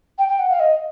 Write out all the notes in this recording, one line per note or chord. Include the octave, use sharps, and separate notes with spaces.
G5
G5
F#5
F5
D#5